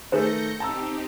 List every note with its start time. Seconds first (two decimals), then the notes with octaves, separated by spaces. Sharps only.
0.12 D#3 A3 G#4 B4 C5 G6 A#6 C#7
0.60 C4 D#4 G4 A5 A#5 E6